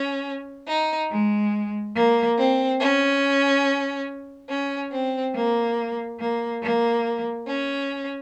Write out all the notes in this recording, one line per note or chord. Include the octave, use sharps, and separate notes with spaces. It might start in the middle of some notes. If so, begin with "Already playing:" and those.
Already playing: C#4
D#4
G#3
A#3
C4
C#4
C#4
C4
A#3
A#3
A#3
C#4